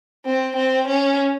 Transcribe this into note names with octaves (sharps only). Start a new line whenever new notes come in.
C4
C4
C#4